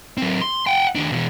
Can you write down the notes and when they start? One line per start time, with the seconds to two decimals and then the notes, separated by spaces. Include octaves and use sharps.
0.18 F#3 C4
0.41 C6
0.67 F#5 G5
0.95 D#2 D4
1.12 B2 E3